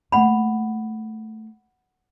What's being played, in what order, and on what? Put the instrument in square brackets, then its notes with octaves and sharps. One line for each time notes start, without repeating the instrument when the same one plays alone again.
[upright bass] A3 A#3 [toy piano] F#5 B5